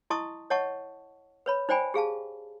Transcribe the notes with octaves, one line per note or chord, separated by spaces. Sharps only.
E4 D#5 A5 C6 C#6 D#6
C#5 D#5 F#5 A5 C#6
B4 C#5 B5
D#4 C5 D5 G5 G#5 B5
G4 G#4 F5 A5